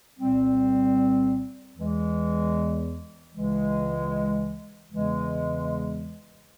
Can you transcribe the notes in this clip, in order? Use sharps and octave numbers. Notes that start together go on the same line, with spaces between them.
C2 A#2 G3 C4
E2 E3 G#3
C#2 C#3 E3 G#3
E2 C#3 E3 G#3